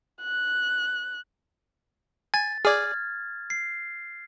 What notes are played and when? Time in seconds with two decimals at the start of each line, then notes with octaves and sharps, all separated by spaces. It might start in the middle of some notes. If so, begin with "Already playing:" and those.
0.22 F#6
2.34 G#5 A6
2.65 G#4 D5 F6 G#6
3.50 C7